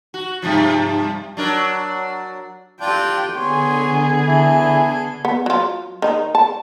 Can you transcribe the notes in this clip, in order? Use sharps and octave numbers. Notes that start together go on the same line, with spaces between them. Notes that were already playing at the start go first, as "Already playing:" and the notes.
F#4
G2 C3 F3
F#3 D4 A#4
C4 D4 F4 G4 G5
D3 B3 G#4 C#5 G#5 C6
E3 A4
B3
F#3 F4
D#3 D#4
A5